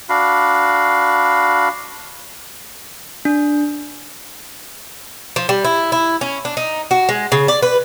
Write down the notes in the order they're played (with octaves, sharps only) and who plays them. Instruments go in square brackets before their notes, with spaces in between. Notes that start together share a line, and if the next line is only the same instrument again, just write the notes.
[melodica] D4 F#4 F5 B5
[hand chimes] D4
[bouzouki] F3
G3
E4
E4
C#4
D4
D#4
F#4
G#3
C#3
D5
B4